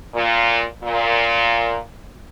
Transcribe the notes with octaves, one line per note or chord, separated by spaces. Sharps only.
A#2
A#2